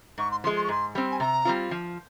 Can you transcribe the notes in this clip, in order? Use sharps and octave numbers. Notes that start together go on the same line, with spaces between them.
G#2 C#6
C6
F3 G#3 C6
C6
C#6
G#2 C6
G3 C4
G#5
C3 A#5
G3 C4 F4
F3